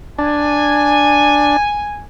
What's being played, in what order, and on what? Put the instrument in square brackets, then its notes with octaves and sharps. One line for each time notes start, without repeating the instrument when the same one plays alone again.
[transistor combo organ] D4 [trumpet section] G#5